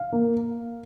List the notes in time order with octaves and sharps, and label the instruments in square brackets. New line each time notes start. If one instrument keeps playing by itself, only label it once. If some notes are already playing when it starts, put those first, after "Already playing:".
Already playing: [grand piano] F5
A#3